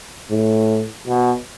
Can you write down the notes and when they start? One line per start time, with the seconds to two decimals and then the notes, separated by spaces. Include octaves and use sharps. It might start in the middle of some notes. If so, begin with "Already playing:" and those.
0.30 A2
1.07 B2